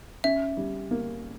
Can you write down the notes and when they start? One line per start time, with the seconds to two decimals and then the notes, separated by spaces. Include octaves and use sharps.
0.24 C#4 E5
0.57 G3
0.91 A#3